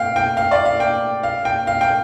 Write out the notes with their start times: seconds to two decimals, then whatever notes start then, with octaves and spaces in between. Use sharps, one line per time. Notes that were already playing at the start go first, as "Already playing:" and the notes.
Already playing: F5 G5
0.16 G5
0.37 F5
0.51 D5
0.65 F5
0.80 G5
1.23 F5
1.45 G5
1.67 F5
1.81 G5